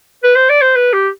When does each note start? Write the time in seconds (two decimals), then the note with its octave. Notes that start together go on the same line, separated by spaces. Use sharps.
0.23 B4
0.36 C5
0.50 D5
0.62 C5
0.76 B4
0.93 G4